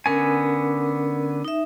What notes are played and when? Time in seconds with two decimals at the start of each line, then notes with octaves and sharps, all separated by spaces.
0.06 D3 B3 C#4 A#4 G#5
1.45 D#4 E5